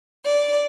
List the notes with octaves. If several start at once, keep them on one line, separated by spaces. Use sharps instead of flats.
D5